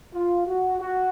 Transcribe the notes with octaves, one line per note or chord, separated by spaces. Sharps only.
F4
F#4
F#4